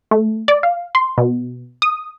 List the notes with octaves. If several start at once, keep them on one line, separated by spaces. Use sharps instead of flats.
A3
D5
F5
C6
B2
D#6